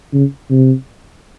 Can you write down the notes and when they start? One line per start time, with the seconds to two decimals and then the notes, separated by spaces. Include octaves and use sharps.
0.13 C#3
0.50 C3